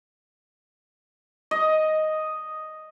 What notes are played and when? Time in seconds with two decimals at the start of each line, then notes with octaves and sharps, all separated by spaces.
1.51 D#5